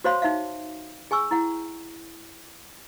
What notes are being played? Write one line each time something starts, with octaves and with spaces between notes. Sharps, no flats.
F#4 C5 C#5 F5 B5 C6
D#4 E5 F5
G#4 G#5 C#6 E6
E4 F#5